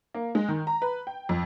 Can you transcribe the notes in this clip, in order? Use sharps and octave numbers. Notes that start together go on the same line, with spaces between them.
A#3
G#3
D#3
A#5
B4
G5
F2